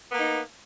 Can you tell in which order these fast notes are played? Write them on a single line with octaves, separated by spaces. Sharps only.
B3 A#3 D#4